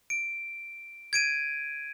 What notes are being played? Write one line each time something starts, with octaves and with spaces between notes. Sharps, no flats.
D7
G#6 D7 D#7